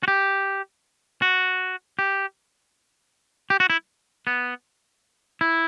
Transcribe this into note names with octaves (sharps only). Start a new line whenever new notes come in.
F#4
G4
F#4
G4
G4
F#4
E4
B3
E4